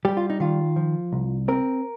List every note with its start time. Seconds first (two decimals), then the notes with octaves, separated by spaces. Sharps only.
0.05 G3 G4
0.17 F4
0.30 D#4
0.40 D#3 F4
0.76 F3
1.12 C2
1.48 C4 A#4